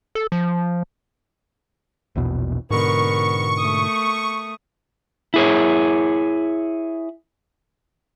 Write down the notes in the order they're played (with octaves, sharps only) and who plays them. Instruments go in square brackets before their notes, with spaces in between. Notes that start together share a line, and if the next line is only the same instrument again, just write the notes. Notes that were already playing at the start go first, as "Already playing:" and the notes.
[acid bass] A4
F3
[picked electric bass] A#1 E2 B2
[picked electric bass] G#2 B2 D3 [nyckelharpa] B3 A#4 [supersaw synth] C#6
[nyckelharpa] A3 D#6
[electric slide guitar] E4 G#4 C#5